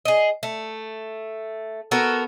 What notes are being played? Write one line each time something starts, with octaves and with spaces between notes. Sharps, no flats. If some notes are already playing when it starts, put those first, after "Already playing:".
G#4 D#5
A3
B3 F#4 A4 A#4